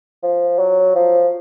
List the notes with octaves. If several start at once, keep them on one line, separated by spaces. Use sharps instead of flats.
F3
F#3
F3